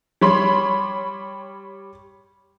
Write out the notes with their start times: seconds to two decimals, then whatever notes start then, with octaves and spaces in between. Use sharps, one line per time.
0.21 G3 C#5 B5 C6